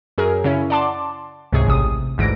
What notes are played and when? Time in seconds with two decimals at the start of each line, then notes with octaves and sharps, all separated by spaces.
0.18 F#2 G#4 A#4
0.44 C#3 C#4 E4
0.70 D5 F#5 A5 C6 D6
1.53 C#2 G#2 C3 G#4 C#5
1.66 A1 C3 D#6
2.18 A1 D2 G#2 E3 A#6 D7